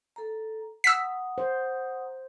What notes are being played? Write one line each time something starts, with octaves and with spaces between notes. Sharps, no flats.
A4 A#5
F#5 A#5 D#6 E6 B6
C5